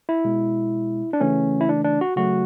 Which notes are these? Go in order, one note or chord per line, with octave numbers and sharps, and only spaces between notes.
E4
B2 G#3
D4
C#3 E3 A3 C#4
E4
D4
D4
F#4
C#3 F#3 A3 F#4